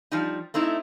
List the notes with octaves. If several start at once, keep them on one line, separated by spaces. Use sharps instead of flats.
F3 G3 D#4
A3 C4 D#4 E4